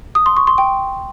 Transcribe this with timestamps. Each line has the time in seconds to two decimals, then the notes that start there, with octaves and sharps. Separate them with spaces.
0.15 D#6
0.26 C6
0.37 C#6
0.47 C6
0.58 G5